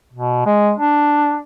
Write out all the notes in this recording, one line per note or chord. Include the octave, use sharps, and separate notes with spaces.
B2
G#3
D4